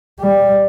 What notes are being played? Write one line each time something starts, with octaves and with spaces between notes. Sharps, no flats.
G3